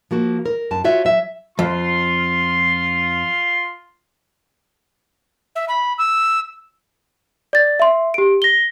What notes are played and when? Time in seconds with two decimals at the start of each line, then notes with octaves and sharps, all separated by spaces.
0.11 F3 A#3 F#4
0.46 A#4
0.71 F#2 A5
0.84 F4 F#4 C#5 E5
1.05 F#3 E5
1.59 F2 F4 C6
5.56 E5
5.68 B5
5.98 E6
7.53 D5 A6
7.80 E5 C6
8.14 G4 D7
8.42 A#6 G7